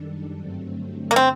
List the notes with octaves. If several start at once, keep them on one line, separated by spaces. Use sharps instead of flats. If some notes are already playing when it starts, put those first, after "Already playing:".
Already playing: F#2 D#3 G3 D4 A4
G2 D3 F#3 A3 C4
A#3
C4